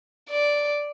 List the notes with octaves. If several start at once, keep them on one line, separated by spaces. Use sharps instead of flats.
D5